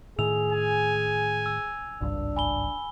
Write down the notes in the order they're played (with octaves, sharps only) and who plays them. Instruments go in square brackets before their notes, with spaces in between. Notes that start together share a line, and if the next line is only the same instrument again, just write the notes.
[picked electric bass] A2 D#3 [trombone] G#4 [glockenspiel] E6 F7
[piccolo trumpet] G#5
[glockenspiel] E6
[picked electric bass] G#1 C#2 G2 [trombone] D4
[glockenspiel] G#5 B5 G7